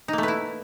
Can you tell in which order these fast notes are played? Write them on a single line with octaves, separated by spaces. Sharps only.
D#4 A#3 A3 B4 E4